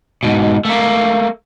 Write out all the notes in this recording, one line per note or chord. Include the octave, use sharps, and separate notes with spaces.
G#2 B2
A3 A#3